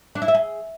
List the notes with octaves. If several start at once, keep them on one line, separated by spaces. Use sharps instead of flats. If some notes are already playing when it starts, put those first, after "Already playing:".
D4
E4
E5
G#4